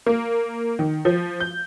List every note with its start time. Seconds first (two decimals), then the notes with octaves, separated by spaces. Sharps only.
0.06 A#3
0.79 D#3
1.05 F3
1.40 G6